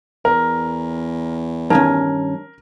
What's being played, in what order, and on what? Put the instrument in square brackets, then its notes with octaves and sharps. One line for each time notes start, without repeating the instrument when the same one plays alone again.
[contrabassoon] E2 [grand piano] A#4
[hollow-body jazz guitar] G2 D#3 C#4 [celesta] D#4 A5 [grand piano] A#4